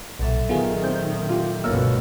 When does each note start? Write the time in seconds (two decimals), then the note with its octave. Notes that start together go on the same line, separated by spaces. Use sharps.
0.19 B1 A#2 F#3 A4 E5
0.49 A#2 D#3 B3 F4 G#4
0.84 C4 G6
1.29 F4 G4
1.64 G1 C#2 B2 A#3 A4 A#4 C#5 E6